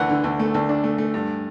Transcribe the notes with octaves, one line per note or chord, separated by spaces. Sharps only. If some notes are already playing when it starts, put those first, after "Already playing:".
Already playing: D2 E3 F#5
D3
D2
A3
D2
D4
A3
A3
G2